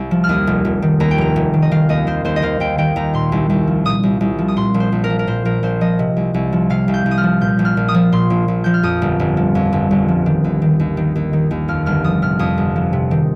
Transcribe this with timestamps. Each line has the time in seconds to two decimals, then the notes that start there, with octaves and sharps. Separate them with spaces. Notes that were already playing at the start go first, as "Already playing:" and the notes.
Already playing: C2
0.11 F3
0.24 F6
0.29 D#2 D#6
0.47 F1
0.65 F1
0.82 D#3
1.00 D#2 A#5
1.11 G5
1.18 F1 A#5
1.36 F1
1.54 D#3
1.62 D#5
1.71 D#3 F5
1.89 D#2 D#5
2.07 D#3 C5
2.24 D#2 C5
2.36 D#5
2.42 D#3 F5
2.60 D#2 G5
2.78 D#3 G5
2.96 D#2 A#5
3.14 A#2 C6
3.32 C2
3.49 C2
3.67 F3
3.85 A#2 D#6
4.03 C2
4.21 C2
4.39 F3
4.48 D#6
4.56 A#2 C6
4.74 A#1
4.80 C5
4.92 A#1
5.04 A#4
5.10 F3
5.19 A#4
5.27 A#2 C5
5.45 A#1 A#4
5.63 A#1 C5
5.81 F3 D#5
5.99 C3
6.17 C2
6.34 C2
6.53 F3
6.70 C3 F5
6.88 C2
6.94 G6
7.06 C2
7.11 D#6
7.18 F6
7.23 F3
7.41 A#2 G6
7.59 A#1
7.65 F6
7.77 A#1
7.88 D#6
7.94 F3
8.12 A#2 C6
8.30 A#1
8.48 A#1
8.64 F3 G6
8.74 F6
8.83 F2 D#6
9.02 G1
9.20 G1
9.37 F3
9.55 F2
9.73 G1
9.91 G1
10.08 F3
10.26 D#3
10.44 D#2
10.62 D#3
10.80 D#2
10.97 D#3
11.15 D#2
11.33 D#3
11.51 D#2
11.68 F2 F6
11.86 G1 F6
12.04 F3 D#6
12.22 C3 F6
12.39 F2 D#6
12.58 G1
12.76 F3
12.93 C3
13.11 D#3